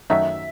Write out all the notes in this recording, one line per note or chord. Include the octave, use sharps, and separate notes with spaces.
F#2 D#3 F#3 A3 D#4 E5